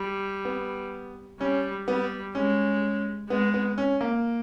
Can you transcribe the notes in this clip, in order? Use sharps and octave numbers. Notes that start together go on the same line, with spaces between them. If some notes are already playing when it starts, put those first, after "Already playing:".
Already playing: G3
B3
G3 C#4
G3 B3
G#3 C#4
G#3 B3
B3
C#4
A#3